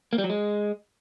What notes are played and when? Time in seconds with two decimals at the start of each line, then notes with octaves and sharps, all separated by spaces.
0.13 A#3
0.18 G3
0.24 F#3
0.30 G#3